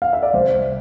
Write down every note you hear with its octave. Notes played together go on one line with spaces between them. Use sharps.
F5
E5
D5
C2 C5